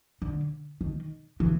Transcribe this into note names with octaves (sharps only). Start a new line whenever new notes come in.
D3
D#3
E3